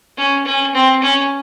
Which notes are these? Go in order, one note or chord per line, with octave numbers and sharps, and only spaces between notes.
C#4
C#4
C4
C#4